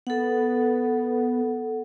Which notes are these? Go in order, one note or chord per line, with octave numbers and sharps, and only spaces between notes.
B3 A4 F#5